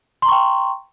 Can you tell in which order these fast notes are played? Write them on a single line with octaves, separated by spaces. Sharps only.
C6 A#5 C#6 G5